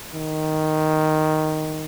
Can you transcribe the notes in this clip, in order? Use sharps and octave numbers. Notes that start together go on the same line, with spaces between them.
D#3